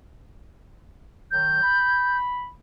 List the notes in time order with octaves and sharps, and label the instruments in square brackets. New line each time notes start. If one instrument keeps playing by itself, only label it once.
[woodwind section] D#3 F#3 [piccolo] G6
[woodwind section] B5